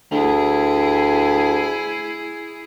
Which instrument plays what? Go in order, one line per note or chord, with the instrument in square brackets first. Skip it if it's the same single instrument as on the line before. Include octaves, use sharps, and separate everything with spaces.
[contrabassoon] D2 [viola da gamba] E4 G#4